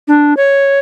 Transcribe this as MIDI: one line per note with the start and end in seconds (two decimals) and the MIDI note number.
0.08 0.34 62
0.37 0.80 73